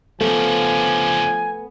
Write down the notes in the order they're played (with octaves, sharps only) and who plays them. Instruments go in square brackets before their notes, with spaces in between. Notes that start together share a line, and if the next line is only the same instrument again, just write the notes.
[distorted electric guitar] C#2 D3 [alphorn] F3 [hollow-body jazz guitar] A3 B3 [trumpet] G#5